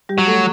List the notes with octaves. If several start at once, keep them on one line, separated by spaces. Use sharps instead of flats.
G3 G4
F#3
A3 A4